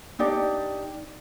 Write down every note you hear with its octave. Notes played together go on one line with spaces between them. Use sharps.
D4 D#4 G4 D5